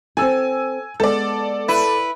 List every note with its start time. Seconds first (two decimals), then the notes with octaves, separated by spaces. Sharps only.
0.17 C4 A4 G#5 E6
1.00 G#3 B3 A4 D5
1.68 E4 B4